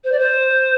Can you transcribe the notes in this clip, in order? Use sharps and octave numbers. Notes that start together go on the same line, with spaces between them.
C5
D5
C5